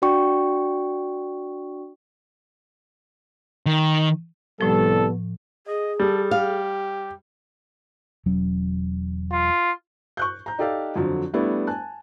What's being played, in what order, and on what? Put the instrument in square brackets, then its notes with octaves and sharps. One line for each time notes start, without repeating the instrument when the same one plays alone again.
[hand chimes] D4 F#4 D5 G5 C#6
[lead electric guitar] D#3
[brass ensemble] C2 A4 [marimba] A2 F3 [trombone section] G3 B3
[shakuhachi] G#4 [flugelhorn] D#5
[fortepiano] G3 [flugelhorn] A4
[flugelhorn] G4 [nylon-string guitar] F5
[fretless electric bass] E1 F#3 C#4
[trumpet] F4
[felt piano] C#6 F#6 G6
A#5 G6
D#4 G4 A4 D5 F5
F2 D3 F3 F#3
G3 A3 B3 D4 E4
G#5 A5 F#6